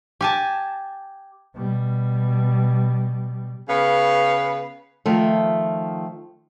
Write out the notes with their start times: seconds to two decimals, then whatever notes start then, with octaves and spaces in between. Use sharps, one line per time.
0.21 G4 G#5 A5
1.54 B2 G3
3.69 C#3 B3 B4 F5
5.06 D#3 F3 A3